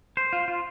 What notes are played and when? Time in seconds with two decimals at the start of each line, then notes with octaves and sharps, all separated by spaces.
0.17 C5
0.33 F4
0.48 F4